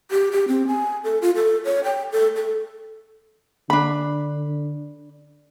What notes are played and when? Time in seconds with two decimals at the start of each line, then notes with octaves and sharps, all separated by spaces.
0.11 G4
0.32 G4
0.48 C4
0.67 G#5
1.04 A4
1.22 F4
1.36 A4
1.65 C#5
1.84 G5
2.12 A4
2.36 A4
3.70 D3 D4 B5